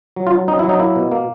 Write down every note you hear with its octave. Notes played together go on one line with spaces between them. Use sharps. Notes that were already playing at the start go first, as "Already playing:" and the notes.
F#3
F4
F#3
F#3 D#4
E4
F#3
D#4
A#3 E4
B2
A#3